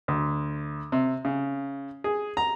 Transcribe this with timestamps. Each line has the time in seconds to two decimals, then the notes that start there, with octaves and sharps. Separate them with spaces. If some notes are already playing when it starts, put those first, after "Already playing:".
0.08 D2
0.92 C3
1.25 C#3
2.04 G#4
2.37 A#5